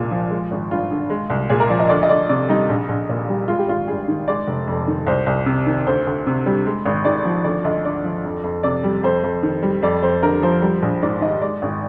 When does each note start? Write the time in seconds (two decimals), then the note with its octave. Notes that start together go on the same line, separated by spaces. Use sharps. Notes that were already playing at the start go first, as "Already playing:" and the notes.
Already playing: C2 A#2 G#3 F4
0.11 F3
0.30 G#3
0.51 G#1
0.71 G2 F4
0.91 D3
1.10 G#3
1.30 C2
1.49 A#2 G#4
1.60 A#4
1.70 F3 D5
1.80 D#5
1.89 D2 D5
2.03 D#5
2.09 D2 D5
2.29 C3 D5
2.49 G3 D#4
2.69 A#1
2.89 A#1
3.09 A#2
3.29 G3
3.48 G#3 F4
3.59 G4
3.68 G#1 F4
3.87 G2 G#4
4.08 D#3
4.28 G#3 D5
4.47 F1
4.67 F2
4.88 D#3
5.06 C2 C5
5.26 C2
5.46 C3
5.66 D#3
5.87 D2 C5
6.07 D2
6.26 C3
6.46 G3
6.66 G#3
6.85 G#1
7.05 G#2 D5
7.25 F3
7.44 D2 D5
7.64 D2 D#5
7.85 D3 D5
8.04 F3
8.24 F2
8.44 F2
8.63 C3 D5
8.83 G3
9.03 F2 C5
9.23 F2
9.43 D#3
9.63 G3
9.82 F2 D5
10.03 F2 C5
10.23 D3 A#4
10.43 F3 C5
10.62 G3
10.82 A#1
11.02 G#2 D5
11.21 D#3 D#5
11.42 G#3 D5
11.62 G#1